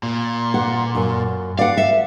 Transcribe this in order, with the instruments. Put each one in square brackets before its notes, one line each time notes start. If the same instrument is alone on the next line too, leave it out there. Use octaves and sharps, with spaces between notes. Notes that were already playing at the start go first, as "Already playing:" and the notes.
[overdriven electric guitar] A#2
[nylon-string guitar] F#5
F#2
[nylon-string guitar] D5 F#5 [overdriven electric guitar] F5
[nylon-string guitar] E5